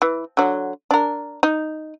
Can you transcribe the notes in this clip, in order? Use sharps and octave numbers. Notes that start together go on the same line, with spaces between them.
E3
D3 F#3
D4 A#4
D#4